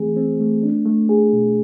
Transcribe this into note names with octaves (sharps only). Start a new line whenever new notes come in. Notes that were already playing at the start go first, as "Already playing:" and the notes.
Already playing: E3 A3 C4 G#4
C4
A3
D4
A3
G#4
B2